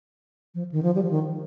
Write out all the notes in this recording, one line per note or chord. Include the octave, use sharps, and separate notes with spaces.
F3
D#3
F3
G3
F3
D#3